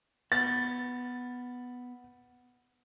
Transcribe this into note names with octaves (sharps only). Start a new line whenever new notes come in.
B3 A6